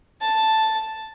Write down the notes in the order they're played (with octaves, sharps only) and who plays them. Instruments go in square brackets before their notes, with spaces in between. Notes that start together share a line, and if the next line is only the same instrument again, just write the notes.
[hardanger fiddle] A5